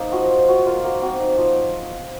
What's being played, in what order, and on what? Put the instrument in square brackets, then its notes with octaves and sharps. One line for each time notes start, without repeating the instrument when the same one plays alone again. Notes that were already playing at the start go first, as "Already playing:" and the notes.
Already playing: [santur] A#3 D#4 C5
F3 F#4
F3
F4 F#4
A#3 F4
A#3 F#4
C4 F#4
D#4
F3